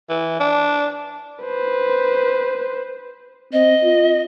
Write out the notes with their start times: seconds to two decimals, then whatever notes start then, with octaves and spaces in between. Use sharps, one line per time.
0.09 E3
0.40 D4
1.44 B4 C5
3.53 C4 D#5
3.84 F4